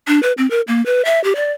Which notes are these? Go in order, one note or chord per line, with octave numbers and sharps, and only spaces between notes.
D4
B4
C4
A#4
A#3
B4
E5
G4
D5